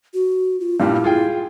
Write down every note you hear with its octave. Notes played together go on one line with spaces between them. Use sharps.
F#4
F4
G2 A#2 G3 E4
F4 G#4 G5